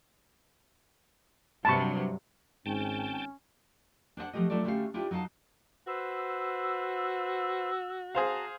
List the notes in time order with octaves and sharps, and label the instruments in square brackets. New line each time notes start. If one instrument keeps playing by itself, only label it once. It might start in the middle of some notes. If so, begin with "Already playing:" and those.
[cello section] G2 C3 F#3 [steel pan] A5 B5 C#6
[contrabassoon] G#1 [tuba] G#2 [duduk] C#4 [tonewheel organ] G5 A5
[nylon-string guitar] D4 C5 D#5 F#5
F3 F#3 A3 G4 D#5
F#3 A3 D4 F4 A4 D5
D3 A3 C#4 F#4 G4 F5
D4 E4 F4 G4
F#3 D#4 F#4 F5 A5
[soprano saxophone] F#4 [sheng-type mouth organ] B4 C5 [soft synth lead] E6
[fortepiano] G#4 C5 F5 [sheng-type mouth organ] A5 A#5